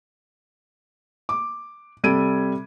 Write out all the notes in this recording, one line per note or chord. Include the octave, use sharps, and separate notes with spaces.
D6
C3 G3 A4 G#6 D7 D#7